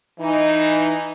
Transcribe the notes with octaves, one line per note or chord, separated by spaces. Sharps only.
E3 D#4